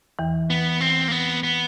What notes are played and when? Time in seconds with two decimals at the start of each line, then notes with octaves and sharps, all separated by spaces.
0.19 E2 E3
0.50 B3
0.81 C4
1.08 A#3
1.12 B3
1.43 B3